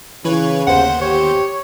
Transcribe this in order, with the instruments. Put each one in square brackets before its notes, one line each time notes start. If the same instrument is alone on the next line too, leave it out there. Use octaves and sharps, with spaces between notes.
[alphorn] C#3 [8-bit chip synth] E3 B4 C#5
[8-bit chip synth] G1 D#2 C5 [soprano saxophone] F#5
[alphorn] G4 [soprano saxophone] C#5